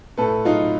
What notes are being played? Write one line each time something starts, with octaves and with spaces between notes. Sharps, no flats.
A2 A4 B4
F#3 D#4 F4